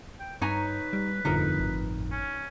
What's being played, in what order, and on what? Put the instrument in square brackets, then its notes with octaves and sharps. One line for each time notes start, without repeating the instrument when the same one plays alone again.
[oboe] G5
[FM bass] G2 [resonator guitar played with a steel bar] D#4 G#5 A#5 [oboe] B4 [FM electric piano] C#5
[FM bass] G3
[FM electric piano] G1 F2 A2 [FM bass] D3 [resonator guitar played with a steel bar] D#4 A#4
[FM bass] G#1
[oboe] C#4